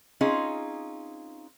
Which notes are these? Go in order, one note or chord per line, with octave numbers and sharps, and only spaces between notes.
C4 C#4 D#4 F4 G#4